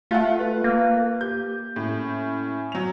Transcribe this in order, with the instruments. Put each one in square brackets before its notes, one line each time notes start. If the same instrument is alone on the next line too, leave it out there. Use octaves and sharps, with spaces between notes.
[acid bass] A3 [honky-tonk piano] F4 F5 F#5
[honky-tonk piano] F4 [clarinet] B4
[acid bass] A#3
[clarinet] G4 [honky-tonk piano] G6
[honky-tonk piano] A2 [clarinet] C#4
[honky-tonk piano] F#3 F7